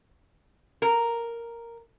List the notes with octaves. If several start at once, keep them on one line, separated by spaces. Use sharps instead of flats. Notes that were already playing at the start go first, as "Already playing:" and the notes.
A#4